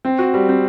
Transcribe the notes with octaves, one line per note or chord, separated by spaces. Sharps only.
C4
F#4
G3
C4